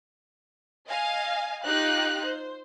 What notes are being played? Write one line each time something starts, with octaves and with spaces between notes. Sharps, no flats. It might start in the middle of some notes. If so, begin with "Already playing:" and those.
D#5 F5 G#5
D#4 F4 G4 F5 F#6
C5